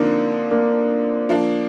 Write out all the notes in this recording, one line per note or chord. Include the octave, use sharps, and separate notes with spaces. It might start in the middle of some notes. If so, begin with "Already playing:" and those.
Already playing: D3 F3 A#3 C4 D4 D#4
A#3 D4
F3 A#3 D4